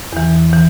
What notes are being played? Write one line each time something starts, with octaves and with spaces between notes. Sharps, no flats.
E2 E3
E3